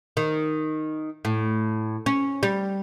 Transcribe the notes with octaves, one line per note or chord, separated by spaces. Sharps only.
D#3
A2
C#4
G3